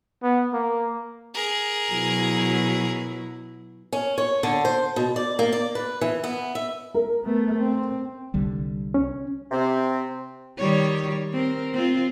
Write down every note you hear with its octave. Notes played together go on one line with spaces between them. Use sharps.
B3
A#3
G#4 A#4
B2 F#3 E4
C#4
C#5
D3
C5
B2
D5
A#3
D5
B4
E3
B3
E5
A#4
A3 B3
C4
C2 D3 G3
C#4
C3 C4
D#3 G3 C#5
C4 A#4
C4 F4